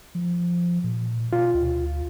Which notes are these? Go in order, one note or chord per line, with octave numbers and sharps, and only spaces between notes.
F3
A#2
B2 F4
D2